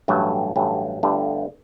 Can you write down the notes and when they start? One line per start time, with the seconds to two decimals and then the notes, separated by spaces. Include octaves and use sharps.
0.08 A1 G2 F#3 A3
0.56 A1 G2 F#3 A3
1.03 G1 G2 D3 A3